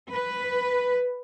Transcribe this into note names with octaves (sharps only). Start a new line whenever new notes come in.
B4